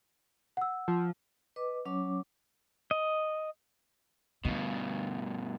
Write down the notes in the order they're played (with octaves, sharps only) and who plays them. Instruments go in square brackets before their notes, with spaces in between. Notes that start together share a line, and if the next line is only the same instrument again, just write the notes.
[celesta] F#5 E6
[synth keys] F3
[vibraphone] B4 D#5 D6
F#3 C#4 C#5 D6
[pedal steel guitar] D#5
[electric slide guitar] G2 B2 [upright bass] D3